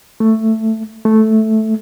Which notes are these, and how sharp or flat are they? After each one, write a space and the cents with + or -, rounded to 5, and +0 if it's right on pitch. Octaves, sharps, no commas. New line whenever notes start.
A3 +10
A3 -5